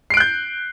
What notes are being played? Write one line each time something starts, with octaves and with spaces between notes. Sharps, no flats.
F#6 G6 C7 D7